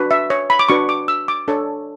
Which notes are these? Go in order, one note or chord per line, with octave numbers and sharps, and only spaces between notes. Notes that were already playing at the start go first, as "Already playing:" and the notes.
Already playing: D4 F#4 B4
E5
C#5
B5
D6
D4 F#4 B4 C#6
D6
E6
D6
D4 A4 C#5